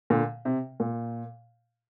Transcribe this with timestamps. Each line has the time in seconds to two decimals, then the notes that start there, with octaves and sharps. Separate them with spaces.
0.10 A#2 D3
0.45 C3
0.80 A#2